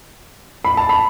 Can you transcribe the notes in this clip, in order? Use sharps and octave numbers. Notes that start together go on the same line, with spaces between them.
B5
A5
B5